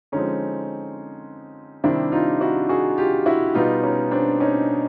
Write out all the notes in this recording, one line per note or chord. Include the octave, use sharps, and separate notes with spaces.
D3 F3 G#3 C4 C#4 D#4
C3 D#3 G3 C4 D4 E4
D#4 F4
E4 F#4
F#4 G#4
F4 G4
E4 F#4
B2 G3 B3 D#4 F4
C#4 D#4
C4 D4
C#4 D#4